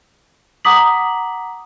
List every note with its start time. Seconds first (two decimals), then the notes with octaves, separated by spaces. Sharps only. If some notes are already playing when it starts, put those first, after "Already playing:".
0.65 F#5 A#5 D6 D#6 B6 F#7